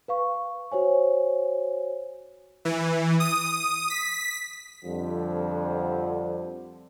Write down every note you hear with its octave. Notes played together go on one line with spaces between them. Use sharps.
B4 F5 C#6
F#4 C5 C#5 G#5
E3
D#6
B6
F2 D3 F3 G3